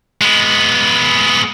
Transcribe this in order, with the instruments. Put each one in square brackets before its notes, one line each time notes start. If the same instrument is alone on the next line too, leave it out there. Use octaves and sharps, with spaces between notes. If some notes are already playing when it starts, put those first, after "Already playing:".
[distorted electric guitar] G#3 B3